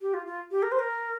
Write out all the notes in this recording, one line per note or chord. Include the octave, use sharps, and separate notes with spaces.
G4
F4
F4
G4
A#4
C5
A#4